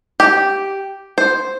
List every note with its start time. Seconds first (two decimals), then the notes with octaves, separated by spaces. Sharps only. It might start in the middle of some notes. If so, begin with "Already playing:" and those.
0.20 G4
1.18 C5